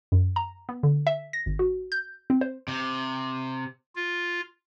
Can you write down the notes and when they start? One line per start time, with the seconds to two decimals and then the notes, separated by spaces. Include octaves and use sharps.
0.12 F#2
0.36 A#5
0.69 B3
0.83 D3
1.07 E5
1.33 A#6
1.46 G#1
1.59 F#4
1.92 G6
2.30 C4
2.41 C5
2.68 C3
3.96 F4